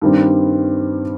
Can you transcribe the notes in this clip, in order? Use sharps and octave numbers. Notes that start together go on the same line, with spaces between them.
G2 D#3 G3 C4